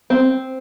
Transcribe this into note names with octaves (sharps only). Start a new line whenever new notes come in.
C4